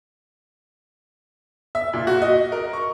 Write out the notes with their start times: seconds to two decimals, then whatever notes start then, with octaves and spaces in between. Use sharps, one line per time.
1.75 E5
1.93 A#2
2.07 F#4
2.22 D#5
2.52 A#4
2.73 C#6